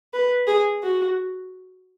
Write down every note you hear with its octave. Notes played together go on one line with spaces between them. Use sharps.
B4
G#4
F#4